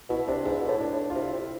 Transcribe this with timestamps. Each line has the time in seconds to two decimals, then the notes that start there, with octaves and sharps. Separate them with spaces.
0.10 B2 E4
0.28 C3 D4
0.45 G#2 E4
0.61 B2
0.68 A2
0.80 D4
0.92 A2
1.10 F4
1.15 C3 E4
1.32 C3